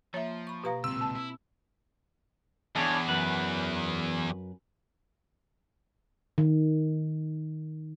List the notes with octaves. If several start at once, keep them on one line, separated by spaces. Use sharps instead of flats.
F3 A#3 C#5 E5
B5 C#6
B2 G4 B4 F5 A#5 A#6
C#2 A#2 C4 E6
A5
E4
E2 D4 G#4 C#5
F#2 B4
D#3